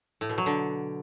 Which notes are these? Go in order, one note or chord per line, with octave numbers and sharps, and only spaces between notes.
A2
B2
F#3
D3